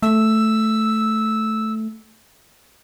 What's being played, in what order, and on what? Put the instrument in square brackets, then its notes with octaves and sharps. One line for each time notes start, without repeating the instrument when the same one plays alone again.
[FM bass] A3 [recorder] E6